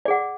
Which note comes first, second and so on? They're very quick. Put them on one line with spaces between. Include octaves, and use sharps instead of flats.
D5 G#4 F#5